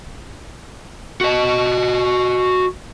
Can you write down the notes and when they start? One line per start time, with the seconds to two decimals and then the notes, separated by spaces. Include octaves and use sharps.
1.21 F#4 D#5